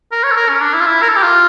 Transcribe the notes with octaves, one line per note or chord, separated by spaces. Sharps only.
A#4
C#5
A4
A#4
C#4
D4
E4
F4
E4
A#4
A4
G4
F4